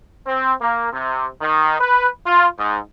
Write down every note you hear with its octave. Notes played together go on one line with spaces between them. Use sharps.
C4
A#3
C3
D#3
B4
F4
G#2